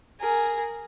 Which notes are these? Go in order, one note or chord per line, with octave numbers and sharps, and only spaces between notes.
G#4 A#4